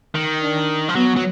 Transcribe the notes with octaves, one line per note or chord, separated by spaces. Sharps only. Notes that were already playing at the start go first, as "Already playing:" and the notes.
D#3
D4
F3
F#3 B3
F#3